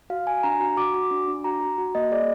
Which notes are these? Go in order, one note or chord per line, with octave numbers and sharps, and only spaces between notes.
F#4 F5
F#4 G#5
D4 A#5
F#4
F#4 D6
F#4 D6
D4
D4
F#4 A#5
F#4
F#4
A#3 D#5
G#4 D5